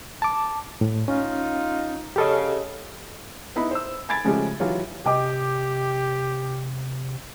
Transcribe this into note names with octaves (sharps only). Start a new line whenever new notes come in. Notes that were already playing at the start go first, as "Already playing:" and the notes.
A5 D6
A2
C#4 D#4 F4
C#3 G4 A4 D#5
B3 D#4 E4 B5
C5 E6
G#5 B5 G#6 A6 D7
C#3 F3 G#3 A3 C#4 G4
E3 F#3 F4 G4 C#5
C3 G4 D#5 G5 D6